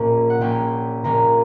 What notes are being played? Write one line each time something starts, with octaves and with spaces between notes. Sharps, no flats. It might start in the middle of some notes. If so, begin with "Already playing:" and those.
Already playing: A#1 A#2 A#3 C#4
F#5
A#1 A#2 A#3 C#4 G5
A#1 A#2 A#3 C#4 A#5